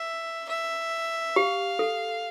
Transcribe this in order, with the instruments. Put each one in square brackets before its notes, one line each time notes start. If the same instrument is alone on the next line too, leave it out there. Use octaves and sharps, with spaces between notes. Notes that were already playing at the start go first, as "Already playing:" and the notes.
Already playing: [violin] E5
E5
[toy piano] G4 [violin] F5
[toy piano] A4